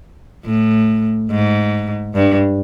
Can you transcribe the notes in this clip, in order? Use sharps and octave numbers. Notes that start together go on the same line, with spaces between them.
A2
G#2
G2